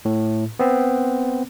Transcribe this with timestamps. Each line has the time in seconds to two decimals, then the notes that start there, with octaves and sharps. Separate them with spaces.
0.05 A2
0.59 B3 C4